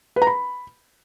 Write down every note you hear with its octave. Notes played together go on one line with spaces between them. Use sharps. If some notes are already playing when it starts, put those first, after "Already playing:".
B4
A#5
B5